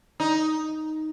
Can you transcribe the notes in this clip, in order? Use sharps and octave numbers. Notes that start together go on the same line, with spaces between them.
D#4